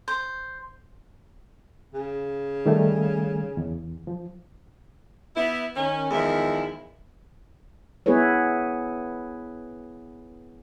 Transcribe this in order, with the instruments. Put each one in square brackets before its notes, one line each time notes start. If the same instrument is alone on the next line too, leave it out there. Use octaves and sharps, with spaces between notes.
[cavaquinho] C5
[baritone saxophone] C#3
[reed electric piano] D#3 G3 A3
E2
F3
[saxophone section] B3 E4
D#3 C#4
E2 D#3 F3 G#3 E4
[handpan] B3 E4 G#4 B4 C#5